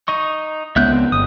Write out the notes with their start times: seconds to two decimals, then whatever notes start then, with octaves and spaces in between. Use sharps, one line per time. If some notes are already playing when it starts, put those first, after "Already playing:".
0.08 D#4 D#5 C#6
0.76 C#2 B3 E5 F#6 G6
0.92 C4
1.12 G1 D#6